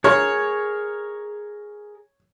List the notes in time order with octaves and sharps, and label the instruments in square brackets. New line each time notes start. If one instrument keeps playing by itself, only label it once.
[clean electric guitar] G#4 A#4 [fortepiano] C#5